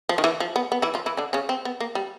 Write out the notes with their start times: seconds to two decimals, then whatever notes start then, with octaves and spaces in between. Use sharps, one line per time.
0.09 F3
0.18 D#3
0.24 E3
0.40 F3
0.56 B3
0.72 B3
0.82 E3 E4
0.94 F3 F4
1.06 E3 E4
1.17 D3 D4
1.33 C#3 C#4
1.49 C4
1.65 B3
1.80 A#3
1.95 G3